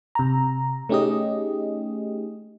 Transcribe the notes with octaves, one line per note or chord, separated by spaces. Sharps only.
C3 A#5
A3 C#4 D#4 G4 G#4 D#5